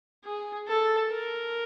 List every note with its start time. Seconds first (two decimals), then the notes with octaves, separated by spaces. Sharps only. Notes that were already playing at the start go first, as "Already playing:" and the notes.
0.25 G#4
0.67 A4
1.10 A#4